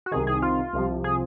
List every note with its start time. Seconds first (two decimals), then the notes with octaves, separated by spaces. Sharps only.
0.06 F#4
0.12 C2 C3 D#3 G#4
0.27 G#4
0.42 F4
0.73 C2 C3 F3
1.04 G#4